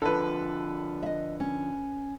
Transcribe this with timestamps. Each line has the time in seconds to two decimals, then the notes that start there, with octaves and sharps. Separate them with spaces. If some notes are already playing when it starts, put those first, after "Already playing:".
0.02 D3 F3 A4 B4
1.03 D#5 E5
1.40 C#4